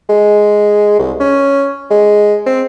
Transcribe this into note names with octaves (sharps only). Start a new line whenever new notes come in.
G#3
C2
C#4
G#3
C4